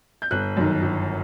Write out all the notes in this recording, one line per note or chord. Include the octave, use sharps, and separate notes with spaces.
G6
G1 F#6
F#2 D#3
G1